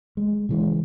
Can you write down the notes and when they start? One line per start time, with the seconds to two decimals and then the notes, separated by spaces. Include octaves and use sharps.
0.17 G#3
0.49 C#3 E3 G#3